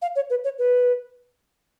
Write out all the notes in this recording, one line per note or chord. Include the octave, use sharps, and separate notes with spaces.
F5
C#5
B4
C#5
B4